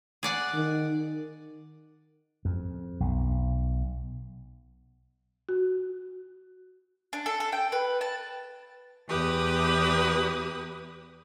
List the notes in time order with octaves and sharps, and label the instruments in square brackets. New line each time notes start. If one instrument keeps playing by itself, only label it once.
[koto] G#4 D5 F#5
[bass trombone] D#3
[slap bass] F2
B1
[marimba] F#4
[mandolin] D4
A4
A4
G5
B4
A5
[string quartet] E2 G4 B4 D#6